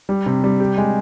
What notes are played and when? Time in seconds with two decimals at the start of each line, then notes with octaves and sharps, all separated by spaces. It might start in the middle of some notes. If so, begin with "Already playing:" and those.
0.09 G3
0.26 C3
0.44 G3
0.60 G4
0.78 G#3